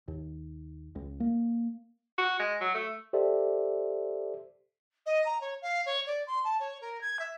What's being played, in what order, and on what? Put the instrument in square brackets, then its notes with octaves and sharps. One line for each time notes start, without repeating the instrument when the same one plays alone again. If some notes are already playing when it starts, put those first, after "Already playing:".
[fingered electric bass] D#2
C#2
A#3
[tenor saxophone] F#4
G#3
F#3
A3
[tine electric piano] G4 A4 C5 D5 E5
[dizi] D#5
A#5
C#5
F5
C#5
D5
C6
A5
C#5
A#4
G#6
E5